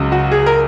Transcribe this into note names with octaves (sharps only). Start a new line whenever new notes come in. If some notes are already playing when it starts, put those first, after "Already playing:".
Already playing: C#2 C#3 F#3
F#4
G#4
A#4